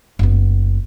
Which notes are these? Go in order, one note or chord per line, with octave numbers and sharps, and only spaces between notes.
F#1 B3